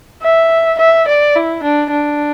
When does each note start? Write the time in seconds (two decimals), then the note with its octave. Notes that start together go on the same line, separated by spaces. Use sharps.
0.23 E5
0.79 E5
1.08 D5
1.36 E4
1.63 D4
1.91 D4